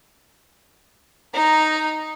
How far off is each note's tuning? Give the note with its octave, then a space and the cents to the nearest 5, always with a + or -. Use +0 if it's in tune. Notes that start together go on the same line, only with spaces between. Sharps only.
D#4 +0 A#5 +0